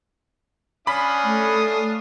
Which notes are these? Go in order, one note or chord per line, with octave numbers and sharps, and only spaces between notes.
C#4 D4 F5 B5 D#6 B6
A3